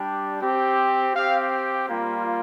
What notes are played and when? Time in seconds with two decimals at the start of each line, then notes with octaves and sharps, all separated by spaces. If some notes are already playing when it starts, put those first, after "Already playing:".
Already playing: G3 D4 G4
0.41 C4 G4
1.15 C4 G4 F5
1.88 G3 A#3 F4